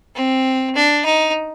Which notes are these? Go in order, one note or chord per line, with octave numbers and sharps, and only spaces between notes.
C4
D4
D#4